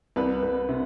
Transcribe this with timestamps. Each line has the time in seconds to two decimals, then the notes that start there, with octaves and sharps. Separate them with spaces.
0.16 C2 B4
0.42 C2
0.69 C3